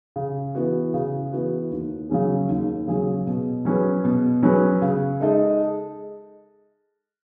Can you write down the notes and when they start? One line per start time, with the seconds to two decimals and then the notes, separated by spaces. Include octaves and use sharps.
0.16 C#3
0.55 E3 B3 F#4
0.94 C#3
1.32 E3 B3 F#4
1.71 D#2
2.09 C#3 F#3 C#4 G#4
2.49 D#2
2.87 C#3 F#3 C#4 G#4
3.26 B2
3.65 F#3 C#4 G#4 B4
4.04 B2
4.43 F#3 C#4 G#4 B4
4.82 C#3
5.20 G#3 D#4 A4 D#5